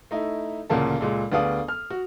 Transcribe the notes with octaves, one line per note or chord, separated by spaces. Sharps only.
A3 D#4 E4
A1 D2 A#2 C#3 A#3 A5
C#2 A#2 G#3 A4
D2 B3 D4 G#4 F5 D#6
F6
F#4